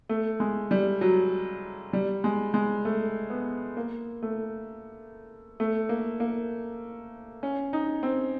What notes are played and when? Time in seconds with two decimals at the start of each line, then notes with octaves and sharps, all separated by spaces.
0.09 A3
0.40 G#3
0.71 G3
1.01 F#3
1.93 G3
2.24 G#3
2.54 G#3
2.85 A3
3.30 B3
3.77 A#3
4.22 A3
5.60 A3
5.89 A#3
6.20 A#3
7.43 C#4
7.73 D#4
8.03 C4